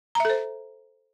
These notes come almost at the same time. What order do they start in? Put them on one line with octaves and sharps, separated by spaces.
A#5 E5 A4 C5